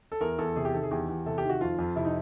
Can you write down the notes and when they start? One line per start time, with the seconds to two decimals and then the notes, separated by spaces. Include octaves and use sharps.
0.12 A4
0.21 E2 A#4
0.39 E2 A4
0.56 C3 G#4
0.65 G4
0.74 D#3 A4
0.83 G#4
0.91 E2 G4
1.09 E2
1.26 C3 A4
1.38 G4
1.44 D#3
1.50 F#4
1.61 F2 F4
1.79 F2
1.96 C3 E4
2.05 D#4